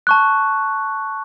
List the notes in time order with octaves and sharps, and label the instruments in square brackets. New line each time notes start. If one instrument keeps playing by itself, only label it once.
[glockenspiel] A5 C#6 F#6